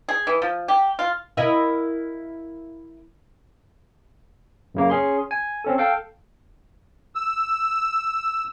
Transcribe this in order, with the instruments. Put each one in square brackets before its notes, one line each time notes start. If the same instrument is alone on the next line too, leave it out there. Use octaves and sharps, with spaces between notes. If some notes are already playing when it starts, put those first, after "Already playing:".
[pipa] G#4
E3
F3
G4
F4
[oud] E4 A#4 D#5
[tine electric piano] F#2 C#3 A#3
C#4 G#4 C6
G#5
C4 C#4 A4
A4 F5 G5
[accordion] E6